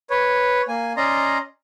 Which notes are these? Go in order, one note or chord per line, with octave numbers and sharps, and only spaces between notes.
B4 C#5
A#3 G#5
C#4 D5 D#5 A#5 C6